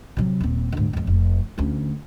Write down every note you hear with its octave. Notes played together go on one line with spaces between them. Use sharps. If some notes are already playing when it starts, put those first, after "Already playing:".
C3 F#3
D#1 C4
D2 G#2
F1 F2
F1
D2 C#4